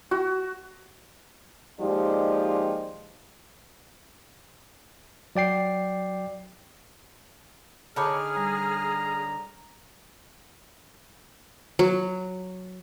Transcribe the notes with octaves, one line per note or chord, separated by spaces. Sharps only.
F#4
D#2 F3 G#3 D#4 G4 D5
F#3 D5 G5 C7
D3 D#4 G#4 C#5 A5 B5 D6 F6
G3 A#5
F#3